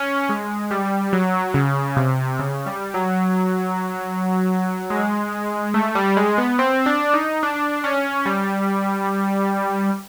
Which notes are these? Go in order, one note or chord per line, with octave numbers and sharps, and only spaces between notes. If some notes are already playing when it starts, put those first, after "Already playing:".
Already playing: C#4
G#3
G3
F#3
C#3
C3
C#3
G3
F#3
G#3
A3
G3
G#3
B3
C4
D4
D#4
D4
C#4
G3